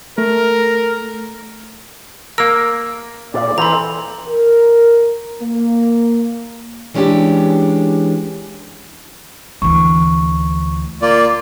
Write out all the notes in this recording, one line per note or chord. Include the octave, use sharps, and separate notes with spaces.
A3 A#4
A#3 A#4 E6
A#2 D5
E3 C4 A4 A#5
A#4
A#3
E3 G#3 C#4 D4 G4
D2 E3 C#6
A#3 F4 D5